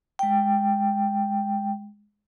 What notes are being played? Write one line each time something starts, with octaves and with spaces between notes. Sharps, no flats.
G#3 G5